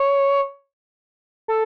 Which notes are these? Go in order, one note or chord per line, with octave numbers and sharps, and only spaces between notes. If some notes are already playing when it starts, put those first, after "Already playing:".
Already playing: C#5
A4